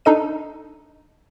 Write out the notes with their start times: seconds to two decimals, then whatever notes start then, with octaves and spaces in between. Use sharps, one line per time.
0.05 D4 D#4 A4 D#5 D#7